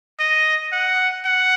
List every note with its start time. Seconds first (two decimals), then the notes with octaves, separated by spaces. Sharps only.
0.19 D#5
0.72 F#5
1.25 F#5